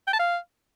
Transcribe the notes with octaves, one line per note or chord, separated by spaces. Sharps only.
G5
A5
F5